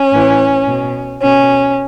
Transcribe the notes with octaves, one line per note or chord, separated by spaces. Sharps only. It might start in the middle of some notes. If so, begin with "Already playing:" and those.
Already playing: C#4
A2 E3
B2
B2 C#4